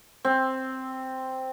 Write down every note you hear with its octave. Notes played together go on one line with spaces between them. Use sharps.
C4